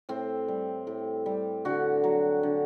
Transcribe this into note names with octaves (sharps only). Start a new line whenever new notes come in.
A2 C4
G3
A2
G3
D3 F#4
F#3
D3